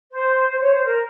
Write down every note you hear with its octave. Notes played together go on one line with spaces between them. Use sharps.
C5
C5
C#5
C5
A#4